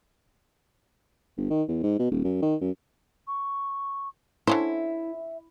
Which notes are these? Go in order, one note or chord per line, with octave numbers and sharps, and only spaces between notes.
G1
D#3
E2
G#2
B2
D#1
F#2
D#3
F#2
C#6
D3 C#4 E4 C5 E5